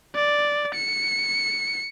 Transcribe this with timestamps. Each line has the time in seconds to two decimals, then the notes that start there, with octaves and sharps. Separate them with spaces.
0.15 D5
0.75 C#7